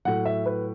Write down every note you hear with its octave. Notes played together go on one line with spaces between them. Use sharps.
A2 F#3 F#5
E5
B4